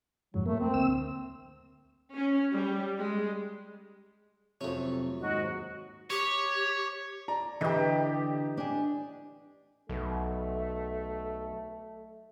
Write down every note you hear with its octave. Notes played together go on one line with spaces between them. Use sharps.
F2 G#2 F#3
A3 A#3
C4
D2 E6
C#4
G3
G#3
F2 C3 F#3 A3 C#4
D#2 G#2 F#3 F#4 D#5
G4 C#5
D5 A#5
D3 E3 G4 D#5
D4 G#5
B1 A3